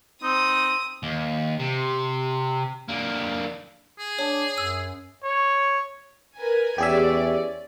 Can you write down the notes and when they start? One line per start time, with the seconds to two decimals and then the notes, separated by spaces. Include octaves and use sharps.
0.23 C4 D#4 D#6
1.03 D#2
1.59 C3
2.88 D3 A#3
3.99 G#4
4.19 D4 C#5
4.58 F#2 E6
5.24 C#5
6.36 A#4 B4 G#5
6.78 E2 C#4 G4 G#4 D5 E5